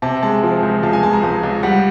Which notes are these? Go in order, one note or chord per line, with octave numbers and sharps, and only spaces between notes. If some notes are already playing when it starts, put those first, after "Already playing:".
C3 A5
G#3 A5
F3
C#2
C#2 A5
G#5
G#3 A5
A#5
C#2
C#2
G3 F#5